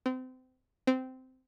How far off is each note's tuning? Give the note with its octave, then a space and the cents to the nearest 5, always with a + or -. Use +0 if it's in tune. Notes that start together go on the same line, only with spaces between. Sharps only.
C4 -30
C4 -15